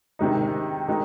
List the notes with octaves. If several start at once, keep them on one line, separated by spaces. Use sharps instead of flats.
C3 D#3 G#3 D#4
D#3 G#3 D#4